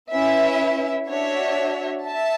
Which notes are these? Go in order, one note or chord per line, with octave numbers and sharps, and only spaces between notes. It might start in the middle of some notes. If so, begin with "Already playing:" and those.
C#4 E4 B4 E5
D4 F#4 C#5 E5
E5 A5